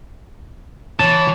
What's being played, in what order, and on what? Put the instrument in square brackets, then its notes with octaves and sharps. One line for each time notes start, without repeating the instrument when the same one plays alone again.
[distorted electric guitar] E3 [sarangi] C#5 [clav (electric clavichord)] A5